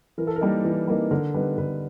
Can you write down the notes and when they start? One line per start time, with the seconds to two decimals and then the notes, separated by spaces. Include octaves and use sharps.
0.18 E3 A#4
0.27 A4
0.36 A#4
0.41 G3 A#3 D#4
0.65 E3
0.88 G3 A#3 D#4
1.11 D3 A#4
1.34 G3 B3 D#4 B4
1.58 D3 B4